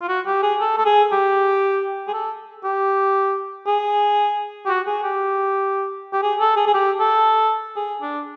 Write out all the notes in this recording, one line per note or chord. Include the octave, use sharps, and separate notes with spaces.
F4
F#4
G4
G#4
A4
A4
G#4
G4
G#4
A4
G4
G#4
G4
F#4
G#4
G4
G4
G#4
A4
G#4
G#4
G4
A4
G#4
D4